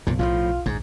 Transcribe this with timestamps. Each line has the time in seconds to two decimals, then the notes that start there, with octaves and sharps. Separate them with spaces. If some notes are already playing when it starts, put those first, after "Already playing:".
0.07 B1 F#2 A#2 C#3
0.19 B1 A2 E3 F3 F4
0.66 A#1 D#2 G#2